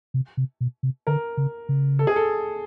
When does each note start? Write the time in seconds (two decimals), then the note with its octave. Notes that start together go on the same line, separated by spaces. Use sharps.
0.14 C3
0.37 C3
0.61 B2
0.83 C3
1.07 D3 A#4
1.37 C#3
1.69 C#3
1.99 A4
2.07 G#4
2.16 A4